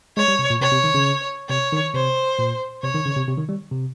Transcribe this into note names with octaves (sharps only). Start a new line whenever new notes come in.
G#3 C#5
G3
C3
A#2
C3 C#5
C3
D#3
C#3
C3 C#5
D#3
C3 C5
A#2
C3 C#5
D#3
C#3
C3
C3
D#3
G3
C3